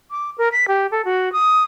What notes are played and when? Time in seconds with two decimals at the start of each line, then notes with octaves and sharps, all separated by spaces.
0.11 D6
0.38 A#4
0.52 B6
0.68 G4
0.91 A4
1.05 F#4
1.33 D#6